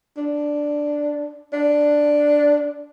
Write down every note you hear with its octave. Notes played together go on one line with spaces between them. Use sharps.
D4
D4